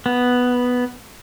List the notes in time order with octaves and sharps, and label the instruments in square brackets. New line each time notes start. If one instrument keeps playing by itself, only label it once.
[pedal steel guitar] B3